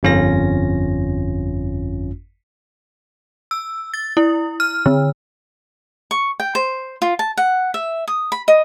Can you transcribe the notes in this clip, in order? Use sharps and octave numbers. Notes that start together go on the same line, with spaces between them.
G1 F2 C#4 F4 A#6
E6
A6
E4
F6
D3
C#6
G5
C5
F4
A5
F#5
E5
D#6
B5
D#5